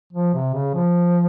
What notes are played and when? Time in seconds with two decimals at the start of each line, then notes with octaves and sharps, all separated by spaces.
0.13 F3
0.34 C3
0.54 C#3
0.74 F3